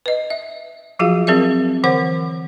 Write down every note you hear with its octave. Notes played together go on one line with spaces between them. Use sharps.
B4 D#5
E5
F3 F#3 F4 F#4 G#4 F5
F#3 C4 G#4 A#4 D5 E5
D3 E3 A#4 C5 F#5